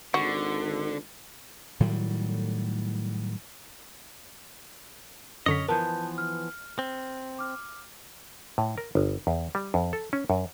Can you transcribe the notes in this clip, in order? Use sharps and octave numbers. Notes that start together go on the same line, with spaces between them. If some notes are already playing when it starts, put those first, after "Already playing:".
G#1 D3 F#4
A2 D#3 F#3 G3
F#2 D3 C#4 C#5 D#5 B6
E3 F3 B3 A#4 A5 G6
F6
C4
D6 F6
A2
A#4
G1
E2
G3
F2
A4
C#4
F#2